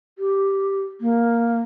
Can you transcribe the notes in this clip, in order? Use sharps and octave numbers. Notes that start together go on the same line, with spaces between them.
G4
A#3